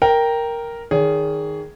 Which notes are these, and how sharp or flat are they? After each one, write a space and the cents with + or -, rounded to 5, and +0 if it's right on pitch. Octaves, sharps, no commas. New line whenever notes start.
A#4 +0 G5 +0
D#3 +0 G#4 +0 C#5 +40